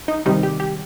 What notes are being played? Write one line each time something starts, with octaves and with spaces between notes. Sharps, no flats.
D#4
C3 D#3 G3 D#4
G4
G4